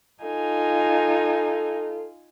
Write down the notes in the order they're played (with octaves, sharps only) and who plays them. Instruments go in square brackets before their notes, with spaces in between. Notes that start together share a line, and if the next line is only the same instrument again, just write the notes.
[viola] D#4 [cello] F4 [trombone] A4 [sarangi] G#5